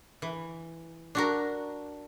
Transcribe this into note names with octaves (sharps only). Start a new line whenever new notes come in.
E3
D4 F#4 A#4